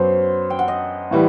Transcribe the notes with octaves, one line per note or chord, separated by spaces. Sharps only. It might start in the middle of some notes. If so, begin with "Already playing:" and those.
Already playing: F#2 F#3 B3 C5
G5
F#5
D#5
A2 E3 G3